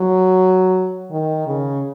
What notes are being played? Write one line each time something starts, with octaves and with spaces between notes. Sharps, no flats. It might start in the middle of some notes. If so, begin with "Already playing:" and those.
Already playing: F#3
D#3
C#3